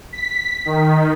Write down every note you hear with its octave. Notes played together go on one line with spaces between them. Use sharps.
B6
D#3